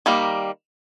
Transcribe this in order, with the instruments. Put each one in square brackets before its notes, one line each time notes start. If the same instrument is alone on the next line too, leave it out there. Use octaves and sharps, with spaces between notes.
[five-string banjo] D#3 G3 A#3